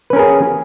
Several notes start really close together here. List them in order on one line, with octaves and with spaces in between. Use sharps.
B4 C#4 A#4 G#4